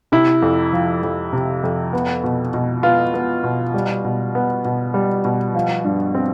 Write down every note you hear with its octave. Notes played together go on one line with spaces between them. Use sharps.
C3 E4
F2
F3
F2
C3
F2
B3
B2
B2
B3 F4
B3
B2
G3
B2
B3
B2
G3
B2
F3
G2
C4